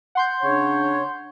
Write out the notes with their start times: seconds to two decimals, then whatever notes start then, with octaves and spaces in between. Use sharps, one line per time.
0.15 F#5 C6 G6
0.42 C#3 D4 C#5